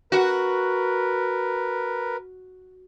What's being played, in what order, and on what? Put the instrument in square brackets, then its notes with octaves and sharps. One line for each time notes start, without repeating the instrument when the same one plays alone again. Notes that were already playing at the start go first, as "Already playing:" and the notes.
[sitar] F#4 [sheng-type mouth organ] A#4 B4